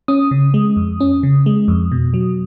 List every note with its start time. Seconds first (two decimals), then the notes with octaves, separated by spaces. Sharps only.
0.08 C#4 D#6
0.31 C#3
0.54 G#3
0.77 F2
1.00 C#4
1.23 C#3
1.46 G#3
1.68 F2
1.92 B2
2.14 F#3